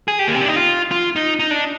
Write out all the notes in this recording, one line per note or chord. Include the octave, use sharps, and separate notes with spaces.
G#4
G4
A#3
C4
D4
D#4
F4
F4
D#4
D#4
D4